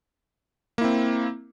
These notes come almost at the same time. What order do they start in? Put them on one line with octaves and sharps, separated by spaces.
A#3 E4 C4